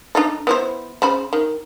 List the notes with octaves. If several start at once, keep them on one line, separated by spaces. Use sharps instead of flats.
D4 D#4 A4
B3 E4 C5
C#3 C5 B5
D#3